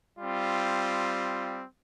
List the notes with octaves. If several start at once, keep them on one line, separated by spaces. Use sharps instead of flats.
G3 C4 F4